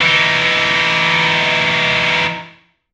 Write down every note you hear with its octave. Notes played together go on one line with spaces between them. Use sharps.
E3 D#4